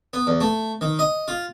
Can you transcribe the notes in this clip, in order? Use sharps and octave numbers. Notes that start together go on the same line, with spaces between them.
B3
E2
A3
D#3
D#5
F4